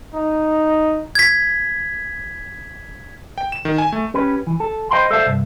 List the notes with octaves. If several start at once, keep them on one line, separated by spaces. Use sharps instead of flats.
D#4
G#6 B6
G5
E7
D#3
G#5
A3
C#4 G4 B4
E3
A4
C5 D#5 F5 G5 B5 C6
A4 C5 D5 E5 F5 A5
C2 G2